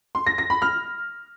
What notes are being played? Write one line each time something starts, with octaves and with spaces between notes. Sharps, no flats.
C6
A#6
A#6
B5
F6